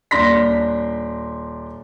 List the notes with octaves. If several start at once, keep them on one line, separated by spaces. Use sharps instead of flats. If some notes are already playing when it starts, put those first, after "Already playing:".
D#1 D4 C6 A#6 B6